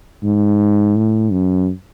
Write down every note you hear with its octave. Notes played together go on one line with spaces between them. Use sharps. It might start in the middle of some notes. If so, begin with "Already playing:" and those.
G#2
A2
F#2